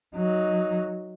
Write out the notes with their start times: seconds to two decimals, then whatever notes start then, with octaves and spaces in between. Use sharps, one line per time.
0.16 F#3 D#4